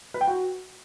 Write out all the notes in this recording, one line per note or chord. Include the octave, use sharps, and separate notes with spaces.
B4
G5
F#4